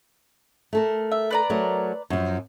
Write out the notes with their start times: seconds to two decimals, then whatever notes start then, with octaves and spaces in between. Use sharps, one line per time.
0.73 A3 A4 A#4
1.11 E5
1.31 B4 D5 A#5
1.50 F#3 A3 A#4
2.10 F#2 F3